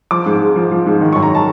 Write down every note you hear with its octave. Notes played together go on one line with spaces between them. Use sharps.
F3 D6
G#2
G#2
F3
F3
G#2
D#3
F#2 C#6
A#5
A5